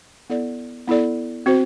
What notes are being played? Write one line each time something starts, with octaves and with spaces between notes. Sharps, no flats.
B3 E4 A4 D5
B3 E4 A4 D5
C4 F#4 C5